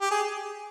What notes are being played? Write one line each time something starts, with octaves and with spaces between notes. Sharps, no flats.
G4
G#4